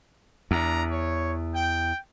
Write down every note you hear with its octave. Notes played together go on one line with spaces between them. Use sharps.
E2 D4 A#5
C#5
G5